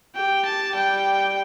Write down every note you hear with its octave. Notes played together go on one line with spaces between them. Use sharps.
G4 G5
A5
G3 G5